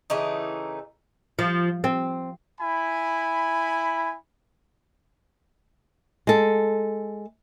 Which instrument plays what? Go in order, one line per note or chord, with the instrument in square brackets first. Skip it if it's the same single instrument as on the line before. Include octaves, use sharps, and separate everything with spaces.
[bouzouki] C#3 E3 A3 D#4
[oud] F3
C4
[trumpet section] E4 G#5 B5
[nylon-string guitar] G#3 A4